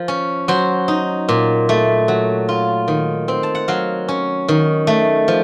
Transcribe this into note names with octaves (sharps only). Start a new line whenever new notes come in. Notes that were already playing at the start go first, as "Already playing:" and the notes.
Already playing: F3 A#4
C#4
F#3 C5
D#4
A#2
A3
F#3
F4
D#3
C4
A5
F#5
F#3 F5
C#4
D#3
A3
F3